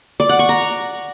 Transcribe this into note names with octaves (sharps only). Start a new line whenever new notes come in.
D5
F#5
C#6
A#5